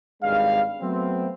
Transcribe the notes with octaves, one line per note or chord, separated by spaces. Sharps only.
G#1 G2 G#3 F5
F#3 A3 B3 C4